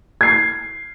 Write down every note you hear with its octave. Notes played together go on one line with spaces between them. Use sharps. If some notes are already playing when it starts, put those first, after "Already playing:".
G#6 C7